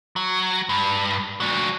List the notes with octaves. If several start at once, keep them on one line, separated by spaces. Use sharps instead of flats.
F#3
G2
F#3 D4